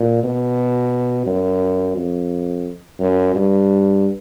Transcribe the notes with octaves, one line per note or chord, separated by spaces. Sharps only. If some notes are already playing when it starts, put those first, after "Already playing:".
Already playing: A#2
B2
F#2
F2
F#2
G2